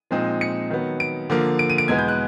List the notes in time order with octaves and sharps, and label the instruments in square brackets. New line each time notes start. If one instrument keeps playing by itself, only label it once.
[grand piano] A#2 F3 G#3 C4 D#4
C#7
D#3 F#3 B3
D7
D3 F3 A#3
D7
D#7
D7
E2 B2 G#3 B3 G#6
G6
F#6